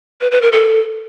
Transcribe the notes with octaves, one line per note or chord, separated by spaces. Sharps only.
B4
B4
A#4
A4